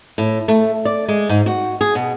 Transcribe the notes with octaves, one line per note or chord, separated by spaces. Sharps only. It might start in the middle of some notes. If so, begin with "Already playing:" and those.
A2
A3
D5
G#3
G#2
F#4
G#4
B2